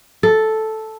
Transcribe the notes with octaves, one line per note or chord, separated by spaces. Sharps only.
A4